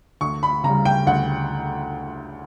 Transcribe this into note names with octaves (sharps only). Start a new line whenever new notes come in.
D2 C#6
B5
C#3 G3 A#5
G5
D2 F#5